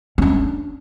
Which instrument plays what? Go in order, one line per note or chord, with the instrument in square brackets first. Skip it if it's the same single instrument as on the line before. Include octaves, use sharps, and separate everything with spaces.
[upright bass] C#4 D4